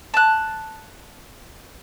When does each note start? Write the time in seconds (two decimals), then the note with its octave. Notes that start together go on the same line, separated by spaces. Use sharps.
0.14 A5 F#6